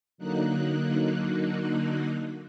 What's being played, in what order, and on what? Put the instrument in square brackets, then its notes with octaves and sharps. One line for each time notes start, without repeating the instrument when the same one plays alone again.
[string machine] D3 F#3 A#3 D#4 F#6